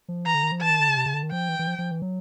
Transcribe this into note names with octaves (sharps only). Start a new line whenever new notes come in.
F3
E3 A#5
D3
D#3
F3
E3 A5
D#3
D3
C#3
C3
C#3
D3
D#3
F3 G5
E3
E3
F3
F3
E3
F#3